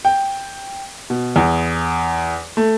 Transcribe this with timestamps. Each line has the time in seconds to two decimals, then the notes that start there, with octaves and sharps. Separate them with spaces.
0.05 G5
1.10 B2
1.36 E2
2.57 A3